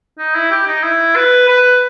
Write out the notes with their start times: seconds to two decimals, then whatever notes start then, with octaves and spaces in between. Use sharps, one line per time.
0.18 D#4
0.35 E4
0.51 G4
0.67 D#4
0.83 E4
1.16 B4
1.48 B4